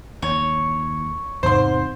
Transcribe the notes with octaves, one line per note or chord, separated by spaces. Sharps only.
D#2 C#5
E2 G#2 C3 C4 C5 C6